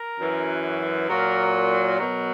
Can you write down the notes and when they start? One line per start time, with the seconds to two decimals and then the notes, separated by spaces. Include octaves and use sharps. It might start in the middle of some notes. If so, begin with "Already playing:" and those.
Already playing: A#4
0.19 F#2 E3
1.09 A#2 F#3 A#4
1.54 A#4
2.00 B2 F#3